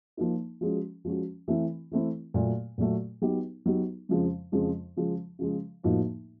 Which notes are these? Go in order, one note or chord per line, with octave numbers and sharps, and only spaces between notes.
F3 A#3 D#4
F3 G#3 C#4 F#4
F3 G#3 C#4 F#4
E3 A3 C4 E4
E3 A3 C4 E4
A#2 F#3 A3
A#2 F#3 A3
F#3 B3 D#4 G4
F#3 B3 D#4 G4
F2 C#3 F3 G#3
F2 C#3 F3 G#3
C#3 F3 G#3
C#3 F3 G#3
A2 F3 A#3 D#4 F#4